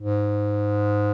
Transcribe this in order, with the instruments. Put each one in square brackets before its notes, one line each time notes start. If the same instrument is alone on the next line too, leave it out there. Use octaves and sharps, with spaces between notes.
[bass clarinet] G#2